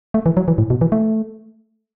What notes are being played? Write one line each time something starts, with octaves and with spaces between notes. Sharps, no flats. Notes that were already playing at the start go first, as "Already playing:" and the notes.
A3
E3
F#3
E3
A2
B2
E3
A3